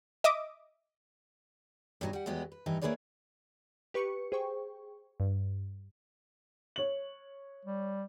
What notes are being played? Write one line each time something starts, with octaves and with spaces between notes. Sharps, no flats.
D#5 E5 D6 D#6
G2 B2 F#3 D4 D#4
G3 F#5
E2 F#3 G#3 B3 G4
B4
G2 E3 D#4
A#3 E4 G#4 B4 C#5 D5
G4 B4 C#6 C#7
G#4 C5 G5 C#6
G2
C#5 F#7
G3